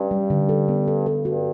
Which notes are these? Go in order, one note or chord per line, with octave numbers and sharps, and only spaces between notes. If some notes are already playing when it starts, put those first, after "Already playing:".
Already playing: G2 C#4
G3
D3
A4
B3
A4
A4
G2 F#4